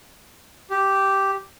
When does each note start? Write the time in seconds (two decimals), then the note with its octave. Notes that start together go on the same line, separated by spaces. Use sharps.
0.71 G4